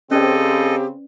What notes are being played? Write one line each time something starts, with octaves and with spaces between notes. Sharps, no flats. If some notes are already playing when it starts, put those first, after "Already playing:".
C#3 C4 C#4 G4 A4 B4 D5 D#5